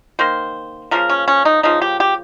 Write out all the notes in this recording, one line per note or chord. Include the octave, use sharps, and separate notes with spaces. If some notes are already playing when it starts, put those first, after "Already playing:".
D#3 A#3 C5
C#3 F3 A#3 A#4
C#4
C#4
D#4
C#3 F3 A#3 D#4
G4
G4